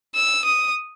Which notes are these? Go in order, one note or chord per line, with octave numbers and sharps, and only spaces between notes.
E6
D#6